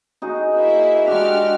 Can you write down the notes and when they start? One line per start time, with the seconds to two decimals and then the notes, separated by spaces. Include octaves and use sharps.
0.22 D#4 F#4 G#4
0.53 A#3 E4 E5
1.07 G#3 D4 F#4 G4 F6